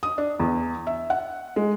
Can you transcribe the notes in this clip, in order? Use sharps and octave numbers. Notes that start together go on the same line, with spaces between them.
D#6
D4
E2
E5
F#5
G#3